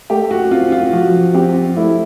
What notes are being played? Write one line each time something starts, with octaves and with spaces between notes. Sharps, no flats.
A3 G4
F#4
C4 F4
F4
F3 F#4
C4 G4
A3 E4